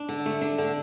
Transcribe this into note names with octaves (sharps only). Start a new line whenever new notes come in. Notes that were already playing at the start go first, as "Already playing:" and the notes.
Already playing: D4
D3
A3
D4
D3